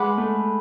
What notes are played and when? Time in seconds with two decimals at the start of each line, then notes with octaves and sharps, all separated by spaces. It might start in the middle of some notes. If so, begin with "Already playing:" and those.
Already playing: G#3 B4 F#5 B5 D6
0.18 A3